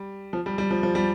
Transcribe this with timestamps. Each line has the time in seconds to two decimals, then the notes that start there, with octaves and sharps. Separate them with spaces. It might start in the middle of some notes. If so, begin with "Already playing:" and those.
Already playing: G3
0.33 F3
0.46 G3
0.58 G3
0.71 F3
0.83 F3
0.95 G3